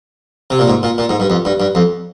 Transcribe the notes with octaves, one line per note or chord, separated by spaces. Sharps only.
C3
A#2
G#2
A#2
A#2
G#2
G2
F2
G2
G2
F2